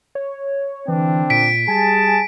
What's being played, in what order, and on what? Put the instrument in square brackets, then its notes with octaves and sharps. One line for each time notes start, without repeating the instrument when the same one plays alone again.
[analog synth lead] C#5
[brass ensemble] D3 C4 D4 [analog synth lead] E3
[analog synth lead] A#2 [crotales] B6 D7
[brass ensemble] G3 G#4 A5 [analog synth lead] G#5